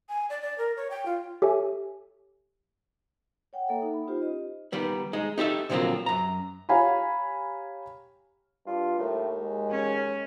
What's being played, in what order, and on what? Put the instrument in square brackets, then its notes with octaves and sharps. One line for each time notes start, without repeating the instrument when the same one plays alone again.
[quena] G#5
D5
D5
A#4
C#5
G5
F4
[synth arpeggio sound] G4 A4 C#5 E5 G#5
[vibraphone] C#5 F#5 G5
A#3 A4 E5
D#4 E5
B5
C#4 D#4 F4 G4 C5
D#5
[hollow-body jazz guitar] D#3 G3 B3
G#3 D#4
D#4 G4 A4 E5
A#2 D3 F3 F#3 A#3 C4
F#2 A#5
[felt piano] G4 C#5 F5 G#5 A#5 B5
[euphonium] G2 [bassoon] F4
[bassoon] D#2 [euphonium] A2
[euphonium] G#3
[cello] C#4